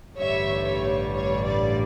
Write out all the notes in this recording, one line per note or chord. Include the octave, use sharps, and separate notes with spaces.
A1 G2 D3 G3 C#5 E5
C#5
C#5
D5